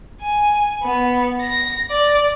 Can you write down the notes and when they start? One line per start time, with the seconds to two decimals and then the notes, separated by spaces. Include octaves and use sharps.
0.21 G#5
0.83 B3
1.41 A#6
1.90 D5